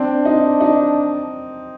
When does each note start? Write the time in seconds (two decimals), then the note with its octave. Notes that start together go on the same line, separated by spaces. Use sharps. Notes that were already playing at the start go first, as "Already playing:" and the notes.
Already playing: C4 D4
0.25 D#4
0.61 D#4